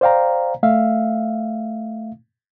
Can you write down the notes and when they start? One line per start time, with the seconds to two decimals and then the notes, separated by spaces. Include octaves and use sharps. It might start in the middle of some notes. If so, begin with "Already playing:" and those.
0.01 C5 D5 F5 G5 A#5
0.63 A3 E5 F5